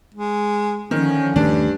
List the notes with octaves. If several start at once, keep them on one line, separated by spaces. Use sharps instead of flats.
G#3
D3 D#3 F3 C#4
D#1 G2 D#3 A3 D4